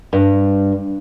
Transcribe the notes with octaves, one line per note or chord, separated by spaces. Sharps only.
G2